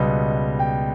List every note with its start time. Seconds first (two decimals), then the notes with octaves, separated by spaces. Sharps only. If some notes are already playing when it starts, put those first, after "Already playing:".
Already playing: C#2 B2 G3 B3 D#5
0.59 G5